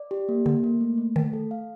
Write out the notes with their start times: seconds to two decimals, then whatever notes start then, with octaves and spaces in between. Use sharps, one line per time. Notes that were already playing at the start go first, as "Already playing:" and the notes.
Already playing: D5
0.11 G4
0.29 A#3
0.46 D3 A#3
0.64 A#3
0.81 A3
0.98 A3
1.16 D#3 A3
1.33 A4
1.51 F5